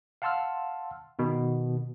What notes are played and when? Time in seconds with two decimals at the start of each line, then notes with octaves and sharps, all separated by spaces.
0.22 F5 F#5 A5 C6 E6 F6
1.19 B2 D#3